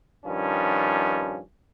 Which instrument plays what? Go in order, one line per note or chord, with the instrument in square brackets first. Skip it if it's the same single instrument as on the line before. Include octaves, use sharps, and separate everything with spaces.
[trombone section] G2 D#3 F3 C#4